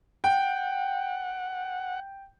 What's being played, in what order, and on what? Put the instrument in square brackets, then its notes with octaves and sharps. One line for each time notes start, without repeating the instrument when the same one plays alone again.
[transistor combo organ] F#5 [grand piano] G5